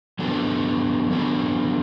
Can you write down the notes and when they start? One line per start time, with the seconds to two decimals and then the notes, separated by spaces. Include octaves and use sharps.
0.19 F#3 B3 D4 F#4 A4
1.10 F#3 B3 D4 F#4 A4